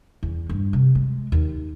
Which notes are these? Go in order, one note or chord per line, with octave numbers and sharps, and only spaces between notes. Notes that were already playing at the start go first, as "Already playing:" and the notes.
E2
G2
C3
G#3
D#2